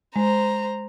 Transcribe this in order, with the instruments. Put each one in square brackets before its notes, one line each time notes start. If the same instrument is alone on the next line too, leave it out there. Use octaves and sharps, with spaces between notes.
[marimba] G#3 [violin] C5 A#5